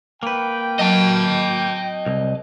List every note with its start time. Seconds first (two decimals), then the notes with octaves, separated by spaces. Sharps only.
0.23 A#3 B4 G5
0.79 F#3 D#5 A5
2.06 C2